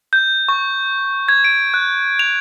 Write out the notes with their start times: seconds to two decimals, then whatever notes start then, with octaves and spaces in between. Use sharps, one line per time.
0.13 G6
0.49 C#6
1.29 G#6
1.44 D7
1.74 F#6
2.19 F7